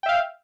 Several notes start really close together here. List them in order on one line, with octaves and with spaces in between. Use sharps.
G5 E5 F5